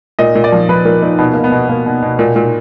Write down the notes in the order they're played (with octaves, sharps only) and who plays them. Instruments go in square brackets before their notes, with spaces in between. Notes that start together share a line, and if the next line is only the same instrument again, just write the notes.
[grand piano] A#2 D#5
A#2
D5
F3
F3 B4
A#2 A#4
A#2 D#4
B2 B3
B2 A#3
B3
B2
B2 A#3
B2
B2
A#2
A#2